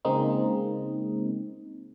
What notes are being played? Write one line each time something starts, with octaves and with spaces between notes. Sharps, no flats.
C#3 G#3 A#3 C4 D#4